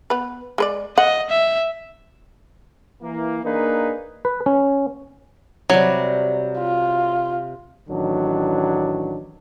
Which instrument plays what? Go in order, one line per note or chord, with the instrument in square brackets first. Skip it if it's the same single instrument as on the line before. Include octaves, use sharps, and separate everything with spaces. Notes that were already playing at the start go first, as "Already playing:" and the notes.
[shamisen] B3 B4
G#3 B4 D5
[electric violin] D#5 [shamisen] F#5
[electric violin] E5
[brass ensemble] E3 A#3
A#3 D4 D#4 G#4 B4
[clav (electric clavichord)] B4
C#4
[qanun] C3 G3 [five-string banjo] F#3
[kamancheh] F4
[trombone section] A1 D#3 F#3 D4